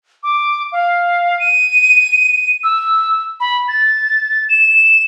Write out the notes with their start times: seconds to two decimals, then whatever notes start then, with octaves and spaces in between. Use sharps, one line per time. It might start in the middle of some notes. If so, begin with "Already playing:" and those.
0.23 D6
0.72 F5
1.40 D#7
2.63 E6
3.40 B5
3.68 A6
4.49 E7